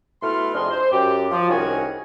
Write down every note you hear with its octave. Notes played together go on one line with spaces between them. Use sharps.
B2 A3 E4 B4 C6 F6
F2 C3 D4 G#4 D#5 C6
C5
F#2 G4
F3
C2 D#3 C#4 F#4 G#4 G#5